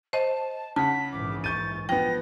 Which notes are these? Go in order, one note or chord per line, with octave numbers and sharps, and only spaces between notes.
C5 D#5 A5
C#3 F#5 A5 B6
A#1 G#2 E3 D6
C#6 G6 A6 D#7
F3 B3 G5 A#6